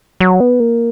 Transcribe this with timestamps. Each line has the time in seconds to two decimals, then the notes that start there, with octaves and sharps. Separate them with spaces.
0.20 F#3
0.40 B3
0.60 A#3